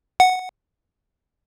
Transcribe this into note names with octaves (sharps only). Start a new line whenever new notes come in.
F#5